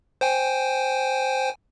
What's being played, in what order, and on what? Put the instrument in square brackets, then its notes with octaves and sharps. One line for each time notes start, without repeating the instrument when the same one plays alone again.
[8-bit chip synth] C5 G5 G#5